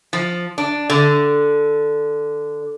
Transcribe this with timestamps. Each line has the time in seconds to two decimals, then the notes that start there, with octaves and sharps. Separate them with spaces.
0.13 F3
0.58 D4
0.90 D3